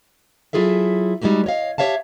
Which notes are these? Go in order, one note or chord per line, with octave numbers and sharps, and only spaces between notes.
F#3 E4 F4 G#4 A4 E5
G3 G#3 D#4 F#4 G4
C#5 D#5 F5
G4 C#5 E5 F5 A5